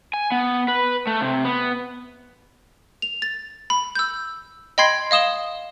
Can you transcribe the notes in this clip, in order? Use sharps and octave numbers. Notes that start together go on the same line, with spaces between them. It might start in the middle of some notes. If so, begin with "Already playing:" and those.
G#5
B3
B4
A3
C3
B3
F7
A6
B5
E6 G6
D#5 G5 B5 C6 G#6 C7
D#5 F5 D#6 E7 G7